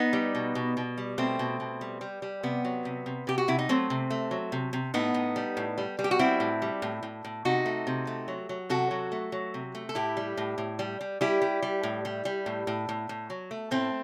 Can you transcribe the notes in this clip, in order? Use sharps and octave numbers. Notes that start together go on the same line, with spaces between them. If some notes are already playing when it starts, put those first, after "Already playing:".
Already playing: B3 D#4
G3
B2
B2
B2
G3
B2 A3 C4
B2
B2
G3
G3
G3
C3 B3
F#3
C3
C3
C3 G4
F#4
C3 E4
D#4
F#3 A3 C4
C3
A3
F#3
C3
C3
A2 B3 D#4
A2
G3
A2
G3
G3
G4
F#4
G3 C4 E4
A2
G3
A2
A2
A2
C3 D#4 F#4
A3
C3
A3
F#3
F#3
C3 F#4 A4
F#3
A3
F#3
C3
A3
A4
A2 E4 G4
G3
A2
A2
G3
G3
G3 E4 G4
G3
G3
A2
G3
G3
A2
A2
A2
A2
F#3
A3
A2 A3 C4